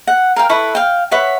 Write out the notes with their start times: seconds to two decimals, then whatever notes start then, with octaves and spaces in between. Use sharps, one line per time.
0.07 F#5
0.36 A#4 F5 G5
0.49 E4 A4 B4 C#6
0.75 F5 G5
1.11 B4 C#5 E5 F#5